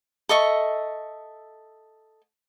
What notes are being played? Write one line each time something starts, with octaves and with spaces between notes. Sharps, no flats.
A4 D#5 E5 C#6